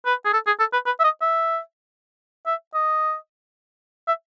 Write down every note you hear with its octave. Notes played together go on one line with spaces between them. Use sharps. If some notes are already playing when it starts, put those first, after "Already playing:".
B4
G#4
A4
G#4
A4
B4
B4
E5
D#5
E5
E5
D#5
E5